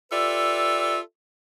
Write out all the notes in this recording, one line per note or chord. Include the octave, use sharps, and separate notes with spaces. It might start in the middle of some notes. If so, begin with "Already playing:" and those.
F4 G4 A4 B4 D5 E5